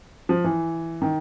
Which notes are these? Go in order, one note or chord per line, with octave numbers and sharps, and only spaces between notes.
F3
E3
D#3